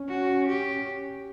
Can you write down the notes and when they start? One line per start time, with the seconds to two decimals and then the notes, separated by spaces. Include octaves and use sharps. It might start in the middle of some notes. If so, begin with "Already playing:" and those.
Already playing: C#4
0.08 F#4
0.48 G4